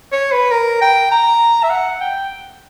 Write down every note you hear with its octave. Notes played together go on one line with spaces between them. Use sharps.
C#5
B4
A#4
G5
A#5
E5
F#5
G5